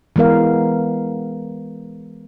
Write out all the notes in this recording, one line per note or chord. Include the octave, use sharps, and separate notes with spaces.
E3 G#3 B3 A#4 F5